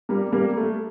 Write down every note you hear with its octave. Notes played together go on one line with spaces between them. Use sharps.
G3 A#3
G3 A#3
A3